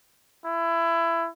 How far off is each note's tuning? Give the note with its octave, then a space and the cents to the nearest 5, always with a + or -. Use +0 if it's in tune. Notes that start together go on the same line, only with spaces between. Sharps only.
E4 +20